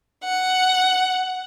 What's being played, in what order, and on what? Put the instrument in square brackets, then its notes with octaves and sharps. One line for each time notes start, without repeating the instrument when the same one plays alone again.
[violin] F#5